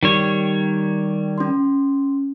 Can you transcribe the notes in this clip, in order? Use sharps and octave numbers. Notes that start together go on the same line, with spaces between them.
D#3 G3 C#5 C#7
C#4 C6